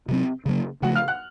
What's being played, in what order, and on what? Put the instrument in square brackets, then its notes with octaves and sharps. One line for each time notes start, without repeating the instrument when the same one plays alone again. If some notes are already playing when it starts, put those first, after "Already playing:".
[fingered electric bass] C3 F#3 C4
C#3 F#3 A#3
[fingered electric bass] C#3 F3 A3 [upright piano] F#4 F#5
[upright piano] F5 F6
F#5 F#6